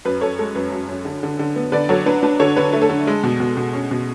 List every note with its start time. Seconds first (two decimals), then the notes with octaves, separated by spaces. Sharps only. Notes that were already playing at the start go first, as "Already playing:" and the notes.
0.05 F#2 B4
0.21 F#2 A4 C#5
0.39 G#3 A4
0.55 F#2 B4
0.72 F#2
0.89 F#2
1.05 D3
1.23 D3
1.39 D3
1.56 B3
1.72 D3 B4 D5
1.89 F#3 A4 C#5
2.06 D4 B4
2.23 D4 B4
2.40 D3 A4 C#5
2.56 D3 B4
2.73 A3
2.82 A4
2.89 D3
3.07 G#3
3.24 B2
3.40 B2
3.57 B2
3.73 C#4
3.91 B2